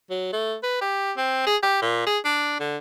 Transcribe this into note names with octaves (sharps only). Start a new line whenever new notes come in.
F#3
A3
B4
G4
C4
G#4
G4
A#2
G#4
D4
D3